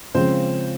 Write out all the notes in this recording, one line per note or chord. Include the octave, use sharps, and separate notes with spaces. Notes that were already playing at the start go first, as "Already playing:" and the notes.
C#3 F3 G#3 C4 C5